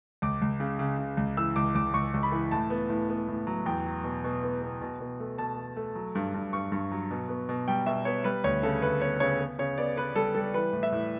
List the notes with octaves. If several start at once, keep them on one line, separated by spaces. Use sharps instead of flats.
C#2 D6
C#2
C#3
C#3
C#3
C#2
E3 E6
C#2 D6
C#2 D6
C#2 C#6
C#2
B5
E3
A2 A5
B3
A2
B3
A2
F#3
E2 G5
F#3
B2
B2
B3
B2
B2
B2
A3
B2 A5
A3
A3
F#3
G2
G2
G2 C#6
G2
F#3
B2
B3
B2
G3 G5
B2 E5
B3 C#5
G3 B4
D2 C#5
C#3 A4
D2 B4
B3 C#5
C#3 C#5
B3
C#3 C#5
B3 D5
B3 B4
G3 A4
G3 A4
E3 B4
A2
E5
A2